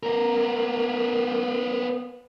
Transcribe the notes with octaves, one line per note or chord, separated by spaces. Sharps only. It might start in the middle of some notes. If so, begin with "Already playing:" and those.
B3 A#4